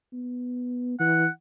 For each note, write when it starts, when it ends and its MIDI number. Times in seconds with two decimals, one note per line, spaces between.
0.13 0.97 59
1.00 1.26 52
1.00 1.29 78